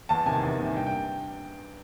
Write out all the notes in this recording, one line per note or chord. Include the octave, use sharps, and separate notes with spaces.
E2 A5
C3 D#3 G#5
E2
C3 D#3
G2 G5
G5